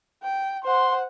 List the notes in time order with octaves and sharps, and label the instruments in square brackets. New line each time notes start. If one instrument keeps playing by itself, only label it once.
[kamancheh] G5
[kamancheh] C5 F#5 [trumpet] C6